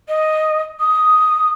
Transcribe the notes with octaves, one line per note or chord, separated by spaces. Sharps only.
D#5
D#6